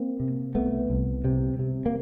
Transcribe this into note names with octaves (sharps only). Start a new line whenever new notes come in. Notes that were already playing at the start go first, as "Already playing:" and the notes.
Already playing: A#3 C4
C3
C2 A3 B3
C2
C3
C3
A#3